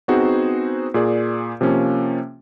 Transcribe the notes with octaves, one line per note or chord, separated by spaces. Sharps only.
B3 C4 D#4 F#4 G#4 C5
A#2 G#4 D5
C3 F3 A#3 C#4